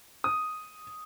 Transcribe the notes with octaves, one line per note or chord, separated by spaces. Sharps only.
D#6